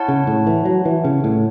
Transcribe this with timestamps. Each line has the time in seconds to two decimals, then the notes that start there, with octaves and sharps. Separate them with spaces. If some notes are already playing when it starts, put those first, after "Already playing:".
Already playing: E4 C#5 F#5 A5
0.08 C#3
0.27 A2
0.47 E3
0.65 F#3
0.85 E3
1.04 C#3
1.24 A2